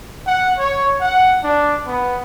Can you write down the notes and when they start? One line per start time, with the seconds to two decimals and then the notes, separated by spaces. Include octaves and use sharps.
0.27 F#5
0.58 C#5
1.01 F#5
1.43 D4
1.87 B3